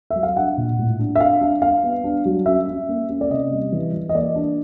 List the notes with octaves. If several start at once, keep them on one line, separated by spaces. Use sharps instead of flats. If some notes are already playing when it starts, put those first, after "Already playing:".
F#3 E5
F5
D4 F#5
A#2
A2
D4
E5
D4 F5
D4
D4 F5
B3
D4
F#3
C#4 E5
C#4
A#3
C#4
D5
C3 D#5
G3
E3
E3
D#5
A#3 D5
D4